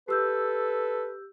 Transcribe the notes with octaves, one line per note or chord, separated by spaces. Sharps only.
G4 A4 B4 E6 G6